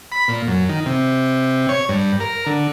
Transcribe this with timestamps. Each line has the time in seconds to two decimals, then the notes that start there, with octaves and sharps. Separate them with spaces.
0.12 B5
0.28 A#2
0.47 F#2
0.69 D#3
0.86 C3
1.69 C#5
1.89 G2
2.20 A#4
2.46 D3